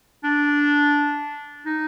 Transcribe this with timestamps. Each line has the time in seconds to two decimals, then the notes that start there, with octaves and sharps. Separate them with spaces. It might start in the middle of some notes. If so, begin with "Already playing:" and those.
0.24 D4
1.66 D#4